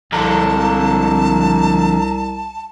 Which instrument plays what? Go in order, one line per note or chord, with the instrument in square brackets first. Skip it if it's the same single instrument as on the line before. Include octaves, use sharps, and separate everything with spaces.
[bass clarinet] C2 [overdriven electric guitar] F2 D3 [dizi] A5 [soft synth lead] A#5